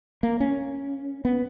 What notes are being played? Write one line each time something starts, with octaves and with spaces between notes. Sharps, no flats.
A#3
C#4
B3